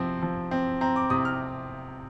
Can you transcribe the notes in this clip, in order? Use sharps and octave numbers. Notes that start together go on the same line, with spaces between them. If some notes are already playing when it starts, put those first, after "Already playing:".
Already playing: C3 F3 C4
F3
C4
C4 A#5
D6
C3 D#6
F6